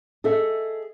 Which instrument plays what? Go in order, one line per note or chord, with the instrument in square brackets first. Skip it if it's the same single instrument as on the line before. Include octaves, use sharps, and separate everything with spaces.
[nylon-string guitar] G#4 A4 D#5 E5